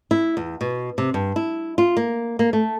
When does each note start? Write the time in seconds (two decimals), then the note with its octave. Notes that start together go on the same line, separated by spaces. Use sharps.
0.11 E4
0.37 E2
0.61 B2
0.98 C3
1.14 G2
1.36 E4
1.78 F4
1.97 A#3
2.39 A#3
2.53 A3